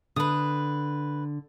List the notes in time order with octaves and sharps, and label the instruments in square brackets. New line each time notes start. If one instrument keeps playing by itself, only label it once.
[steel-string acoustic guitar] D3 [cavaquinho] B4 D#6